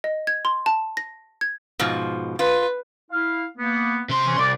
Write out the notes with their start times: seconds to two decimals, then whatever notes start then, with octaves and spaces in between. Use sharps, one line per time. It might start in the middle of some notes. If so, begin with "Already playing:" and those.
0.04 D#5
0.27 G#6
0.45 C6
0.66 A5
0.97 A#6
1.41 G#6
1.79 G#2 B2 F3
2.39 F4 B4
3.11 E4 F5
3.57 A#3 B3
4.09 C3 C6
4.26 E3 C#4
4.38 C2 D5